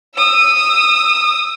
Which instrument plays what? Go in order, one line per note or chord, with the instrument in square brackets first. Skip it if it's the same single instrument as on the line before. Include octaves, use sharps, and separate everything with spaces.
[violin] D#6 E6